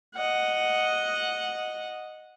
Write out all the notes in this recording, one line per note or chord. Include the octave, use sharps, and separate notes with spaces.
D#5 F#5